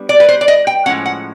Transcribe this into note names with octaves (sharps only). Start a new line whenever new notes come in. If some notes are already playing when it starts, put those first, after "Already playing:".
Already playing: G3 B3 D4
D5
B4
C5
D5
D#5
G5
A2 F3 G#3 C#4 F#5
F#5